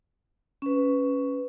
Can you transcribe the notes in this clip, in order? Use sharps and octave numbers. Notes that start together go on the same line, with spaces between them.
C#4 B4